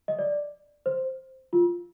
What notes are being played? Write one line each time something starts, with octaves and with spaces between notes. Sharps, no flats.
D#5
D5
C5
F4